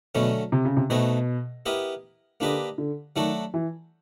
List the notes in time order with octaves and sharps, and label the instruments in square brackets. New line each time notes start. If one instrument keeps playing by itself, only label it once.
[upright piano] B2 [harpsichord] D3 F#3 A3 C#4
[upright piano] C3
C#3
C3
[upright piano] B2 [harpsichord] A3 C4 D#4 F#4
[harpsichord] B3 E4 G4 A#4 D#5
[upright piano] D3 [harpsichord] A#3 D4 G4 B4 D#5
[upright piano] D3
[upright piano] D#3 [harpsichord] F#3 A3 D4 F#4 A4
[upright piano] E3